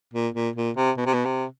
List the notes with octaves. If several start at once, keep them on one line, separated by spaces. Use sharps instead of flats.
A#2
A#2
A#2
C3
B2
C3
B2
C3